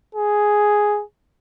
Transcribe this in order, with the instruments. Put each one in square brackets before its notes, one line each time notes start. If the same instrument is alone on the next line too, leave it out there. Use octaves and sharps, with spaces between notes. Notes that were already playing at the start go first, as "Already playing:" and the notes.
[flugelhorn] G#4